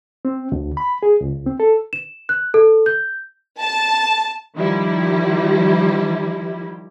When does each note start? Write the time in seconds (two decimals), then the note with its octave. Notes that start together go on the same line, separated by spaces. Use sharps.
0.25 C4
0.52 D2
0.77 B5
1.03 G#4
1.21 C#2
1.47 C4
1.60 A4
1.93 E7
2.29 F#6
2.54 A4
2.86 G6
3.59 A5
4.55 D#3 F3 G3 E4